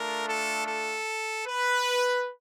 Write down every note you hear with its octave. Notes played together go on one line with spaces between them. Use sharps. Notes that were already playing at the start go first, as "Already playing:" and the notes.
Already playing: A3 D4 F4 A#4
A4
A4
B4